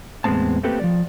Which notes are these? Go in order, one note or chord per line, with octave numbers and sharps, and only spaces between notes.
E2 A2 G#3 B3 C4 A5
A3 A#3 C4 G4 A4 B4
F3 G3 D5